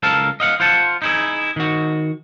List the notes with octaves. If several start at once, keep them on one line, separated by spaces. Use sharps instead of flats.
C#2 A4 A#4 F5 A5
D#5 F5 F#5
F4 C5 F#5 A5
D#4 E4 G#4
D#3 F#4